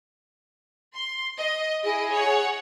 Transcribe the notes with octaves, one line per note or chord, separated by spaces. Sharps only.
C6
D#5
E4 G#4 D#5
C#5 F#5